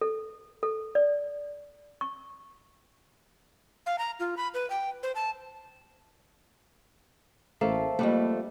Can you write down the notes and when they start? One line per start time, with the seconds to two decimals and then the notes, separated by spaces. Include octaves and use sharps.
0.01 A4
0.63 A4
0.95 D5
2.01 C#6
3.86 F5
3.99 A#5
4.20 F4
4.37 B5
4.54 B4
4.70 G5
5.03 C5
5.15 A5
7.61 A1 A3 A#3 A4 C5
7.99 F2 G3 A3 A#3 D4 B4